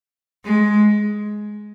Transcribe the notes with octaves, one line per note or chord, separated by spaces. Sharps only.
G#3